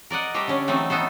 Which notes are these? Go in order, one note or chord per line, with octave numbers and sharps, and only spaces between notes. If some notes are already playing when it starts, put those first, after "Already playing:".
A#4 D5 D#5 F#5
G3 A3 G4 C5 G5 A#5
D3 C#4
E3 F#3 A3 C4 D#4
B3 D#4 A4 C5